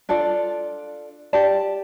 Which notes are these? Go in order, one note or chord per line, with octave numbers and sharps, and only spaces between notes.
D4 F4 A4 D5
G4 D5 A5